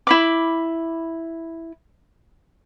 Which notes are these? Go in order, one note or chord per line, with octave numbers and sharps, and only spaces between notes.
E4 B5 D6